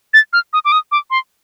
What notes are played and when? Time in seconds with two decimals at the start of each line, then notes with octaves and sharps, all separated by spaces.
0.14 A6
0.33 F6
0.53 D#6
0.65 D6
0.72 D#6
0.92 D6
1.10 C6